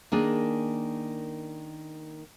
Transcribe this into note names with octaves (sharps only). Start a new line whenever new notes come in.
D#3 A#3 D4 G#4